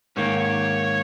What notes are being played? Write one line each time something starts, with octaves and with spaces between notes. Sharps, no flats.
G#2 D#3 A#3 C#5